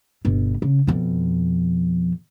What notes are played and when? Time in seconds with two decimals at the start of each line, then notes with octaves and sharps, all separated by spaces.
0.25 G1 B2
0.62 C#3
0.87 F2 B2